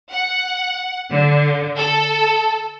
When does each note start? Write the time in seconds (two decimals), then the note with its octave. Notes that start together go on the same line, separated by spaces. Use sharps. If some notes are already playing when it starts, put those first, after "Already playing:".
0.11 F#5
1.10 D3
1.77 A4